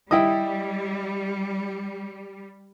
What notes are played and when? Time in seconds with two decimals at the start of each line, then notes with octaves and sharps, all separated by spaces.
0.11 G3 E4 D#5 G5 D#6